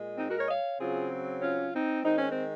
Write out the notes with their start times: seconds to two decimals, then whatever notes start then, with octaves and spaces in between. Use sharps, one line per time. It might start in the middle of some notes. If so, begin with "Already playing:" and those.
Already playing: A#2 G#3
0.17 C4 D#4
0.29 F#4 A#4
0.39 A#4 C#5
0.45 D#5
0.49 C#5 F5
0.79 C#3 F#3 C4 F4 G#4
1.42 C#4 F4
1.73 C4 D#4
2.04 D#3 G#3 C4 D#4
2.17 C#4
2.30 C4